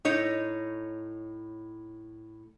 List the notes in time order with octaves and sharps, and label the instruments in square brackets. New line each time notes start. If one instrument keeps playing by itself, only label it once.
[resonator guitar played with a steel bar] A2 D#4 C#5